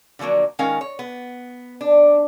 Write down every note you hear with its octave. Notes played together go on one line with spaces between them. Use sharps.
D3 F3 F#3 A#3 D4
D#3 G#3 C#4 A#4 F5
C#5
B3
D4